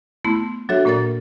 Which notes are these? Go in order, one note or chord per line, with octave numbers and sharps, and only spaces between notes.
A3 B3 E4 C6
F#3 D4 F#4 A4 C#5 E5
A#2 A#3 A#4 D5 A6